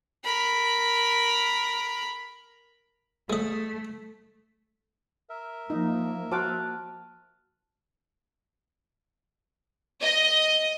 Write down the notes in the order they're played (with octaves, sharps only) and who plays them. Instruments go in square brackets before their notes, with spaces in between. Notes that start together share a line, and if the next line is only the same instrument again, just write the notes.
[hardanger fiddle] A#4 B5
[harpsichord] G#3 D#5 [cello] A3
[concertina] A#4 E5
[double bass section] F3 A#3 [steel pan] D#4
[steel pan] F#4 C5 D6 [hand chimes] A5 F6 F#6
[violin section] D#5